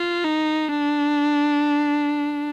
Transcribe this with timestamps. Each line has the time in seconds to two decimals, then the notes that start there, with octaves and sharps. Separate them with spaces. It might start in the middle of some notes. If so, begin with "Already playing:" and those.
Already playing: F4
0.25 D#4
0.69 D4